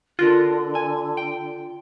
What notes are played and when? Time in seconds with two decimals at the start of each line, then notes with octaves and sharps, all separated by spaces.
0.19 D3 F4 F#4 A#4
0.75 G#5
1.17 G5